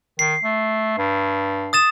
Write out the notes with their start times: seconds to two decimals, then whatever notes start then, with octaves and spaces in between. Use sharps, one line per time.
0.19 D#3 C7
0.43 A3
0.98 G2
1.73 D#6 A6 E7